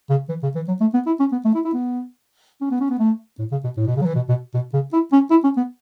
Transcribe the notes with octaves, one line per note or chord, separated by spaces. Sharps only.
C#3
E3
C#3
E3
F#3
A3
B3
E4
C#4
B3
A3
E4
E4
B3
C#4
B3
C#4
B3
A3
A2
C#3
B2
A2
B2
C#3
F#3
E3
B2
B2
B2
C#3
E4
C#4
E4
C#4
B3